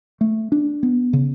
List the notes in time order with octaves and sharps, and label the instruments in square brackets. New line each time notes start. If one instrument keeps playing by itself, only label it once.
[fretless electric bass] A3
D4
B3
C#3